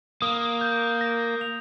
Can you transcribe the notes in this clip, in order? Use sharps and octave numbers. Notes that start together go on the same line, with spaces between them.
A#3 D#6
G6
A#6
F7